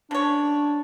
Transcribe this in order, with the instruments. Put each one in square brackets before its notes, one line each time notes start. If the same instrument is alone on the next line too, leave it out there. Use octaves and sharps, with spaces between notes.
[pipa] C#3 C#5 [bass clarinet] D4